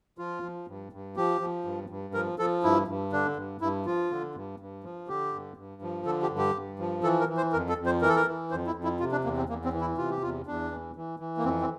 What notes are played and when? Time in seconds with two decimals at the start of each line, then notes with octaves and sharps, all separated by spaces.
0.18 F3 F4
0.43 F3
0.67 G2
0.92 G2
1.16 F3 G4
1.41 F3
1.65 G2
1.90 G2
2.14 F3 A#4
2.38 F3 A4
2.63 G2 E4
2.88 G2
3.12 D3 D4
3.37 G2
3.61 G2 E4
3.86 F3 F4
4.11 D3
4.35 G2
4.60 G2
4.84 F3
5.08 D3 G4
5.33 G2
5.57 G2
5.82 F3
6.06 D3 A4
6.22 G4
6.30 G2
6.38 G4
6.55 G2
6.79 F3
7.03 E3 A4
7.20 A#4
7.28 E3
7.37 C5
7.53 F2 A#4
7.69 A4
7.78 F2
7.86 C5
8.02 E3 A#4
8.09 A4
8.16 A#4
8.26 E3
8.51 F2 C5
8.67 E4
8.75 F2
8.83 E4
9.00 C3 F4
9.12 D4
9.24 E2 A#3
9.37 C4
9.49 E2 A#3
9.64 C4
9.73 E3
9.81 E4
9.98 C3 F4
10.10 G4
10.22 E2 F4
10.46 E2 D4
10.71 E3
10.96 E3
11.20 E3
11.37 A#3
11.44 F2 C4
11.61 C4